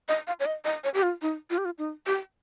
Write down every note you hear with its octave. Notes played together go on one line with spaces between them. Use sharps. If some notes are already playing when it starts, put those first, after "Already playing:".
D#5
F5
C#5
D#5
D#5
C#5
G4
F4
D#4
F4
G4
F4
D#4
G4